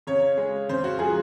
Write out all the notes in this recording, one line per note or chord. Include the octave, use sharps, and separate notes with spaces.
C#3 C#5
G#3
C#3 C5
F#4
F3 G#3 G#4